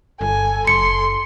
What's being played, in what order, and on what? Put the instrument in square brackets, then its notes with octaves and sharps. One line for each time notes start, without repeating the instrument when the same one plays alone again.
[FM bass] G1 [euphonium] A4 [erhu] G#5
[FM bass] F#1 [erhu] C6 [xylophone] C#7